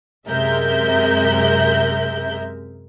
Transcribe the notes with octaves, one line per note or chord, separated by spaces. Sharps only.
F#2 C3 G#3 A#4 E5 G6